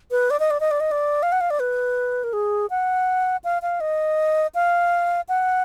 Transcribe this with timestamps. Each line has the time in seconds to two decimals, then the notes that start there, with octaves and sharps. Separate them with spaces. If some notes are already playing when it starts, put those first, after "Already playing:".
0.11 B4
0.30 D5
0.40 D#5
0.50 D5
0.60 D#5
0.71 D5
0.80 D#5
0.91 D5
1.23 F5
1.32 F#5
1.41 F5
1.50 D5
1.60 B4
2.24 A#4
2.33 G#4
2.70 F#5
3.44 F5
3.62 F5
3.80 D#5
4.55 F5
5.29 F#5